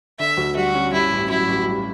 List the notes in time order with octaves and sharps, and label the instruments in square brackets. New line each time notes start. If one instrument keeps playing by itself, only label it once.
[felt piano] D3 [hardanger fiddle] E5
[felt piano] D2
[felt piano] G3 [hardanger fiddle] F#4
[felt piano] C#4
[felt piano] G2 [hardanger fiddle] E4
[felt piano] A1
[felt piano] F#3 [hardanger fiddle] E4
[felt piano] A1
G2